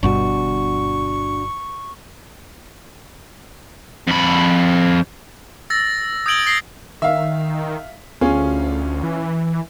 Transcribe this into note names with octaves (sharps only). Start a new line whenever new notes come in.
G1 G2 B2 D4 F#4 C#6
F2 B5
E6 A6 A#6
D#6 G6 G#6 D7 F#7 G7
D#6 A#6 C7 G7
D#3 E5 F5
D2 C#4 F4 G#4
E3